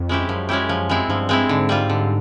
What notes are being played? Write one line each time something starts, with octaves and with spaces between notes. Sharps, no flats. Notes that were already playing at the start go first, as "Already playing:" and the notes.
Already playing: F2
G#3 C#4 E4 G4
F#2 F3
G#3 C#4 E4 G4
F3
G#3 C4 E4
G2 F3
G#3 C4 E4
G#2 D3
G3 C4 F4
D3